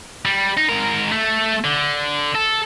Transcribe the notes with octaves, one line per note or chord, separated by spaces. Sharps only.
G3
D#4
G#2 A#4
A3
D3
A4